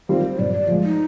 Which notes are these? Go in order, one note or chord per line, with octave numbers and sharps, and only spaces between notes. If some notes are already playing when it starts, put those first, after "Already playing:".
D#3 G3 C4 F4 C5
G2 D5
D5
F3 G#3
D#4